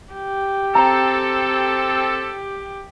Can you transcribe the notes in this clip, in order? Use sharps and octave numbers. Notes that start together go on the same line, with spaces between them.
G4
C4 A4 A#5